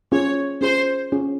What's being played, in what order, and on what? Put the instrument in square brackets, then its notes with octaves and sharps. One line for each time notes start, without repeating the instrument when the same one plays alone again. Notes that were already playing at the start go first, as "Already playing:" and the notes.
[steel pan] C#4 F4 G#4 [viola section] C#5
[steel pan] C#4 F4 G#4 [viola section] C5
[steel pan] C#4 F4 G#4